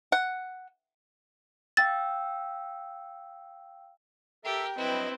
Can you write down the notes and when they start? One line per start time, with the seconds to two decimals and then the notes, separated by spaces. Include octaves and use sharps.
0.12 F#5
1.77 F5 G5 E6 A6
4.45 G4 A4 A#4 E5 G5
4.78 G2 F#3 C4 E4 B4 D#5